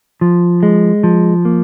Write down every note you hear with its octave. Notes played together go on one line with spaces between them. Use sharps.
F3
G#3
F3
A#3